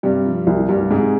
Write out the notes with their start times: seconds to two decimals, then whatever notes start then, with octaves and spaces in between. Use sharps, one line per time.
0.03 G2 C3 G3
0.26 F3
0.47 C2
0.69 C2 G2 G3
0.91 G#2 C3 G#3